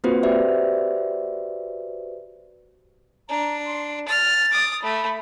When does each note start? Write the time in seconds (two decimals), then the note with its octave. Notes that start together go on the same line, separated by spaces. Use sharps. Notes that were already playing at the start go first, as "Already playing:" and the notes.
0.04 A#3 C4 F4 F#4 B4 C5
0.23 F#4 G4 B4 C5 D5 E5
3.29 D4 A#5
3.66 C6
4.08 F6 A6
4.51 D6 D#6
4.82 A3 B5